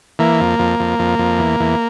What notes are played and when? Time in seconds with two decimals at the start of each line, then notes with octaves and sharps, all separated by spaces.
0.19 E3 A#3
0.40 F2
0.59 F2
0.80 F2
0.99 F2
1.19 F2
1.39 E2
1.60 E2